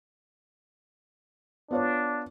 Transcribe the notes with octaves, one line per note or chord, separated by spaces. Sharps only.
B3 D4 F4 C#5